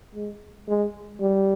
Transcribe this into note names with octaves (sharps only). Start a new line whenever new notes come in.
G#3
G#3
G3